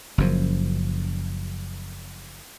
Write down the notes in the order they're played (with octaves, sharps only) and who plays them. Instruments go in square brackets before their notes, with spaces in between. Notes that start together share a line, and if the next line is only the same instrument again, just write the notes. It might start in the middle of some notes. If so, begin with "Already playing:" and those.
[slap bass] F#1 F#2 F3